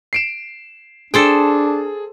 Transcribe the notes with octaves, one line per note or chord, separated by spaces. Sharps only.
C7 D7 E7
D4 G#4 A4 C5 G5